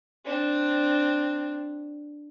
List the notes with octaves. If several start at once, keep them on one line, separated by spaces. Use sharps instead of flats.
C4 D4